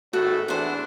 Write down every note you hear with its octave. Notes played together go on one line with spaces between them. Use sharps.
G#1 A2 F#4 A4
E2 E3 D4 C5 F#5